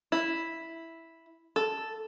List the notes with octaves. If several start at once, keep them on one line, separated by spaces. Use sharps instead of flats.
E4
A4